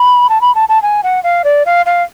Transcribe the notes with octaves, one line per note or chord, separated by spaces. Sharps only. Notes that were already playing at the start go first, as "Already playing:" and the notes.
Already playing: B5
A5
B5
A5
A5
G#5
F#5
F5
D5
F5
F5